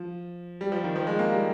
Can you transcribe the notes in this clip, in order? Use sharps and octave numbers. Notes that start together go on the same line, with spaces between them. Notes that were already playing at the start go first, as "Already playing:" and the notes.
Already playing: F3
G3
F3
D#3
F3
G#3
A#3
G3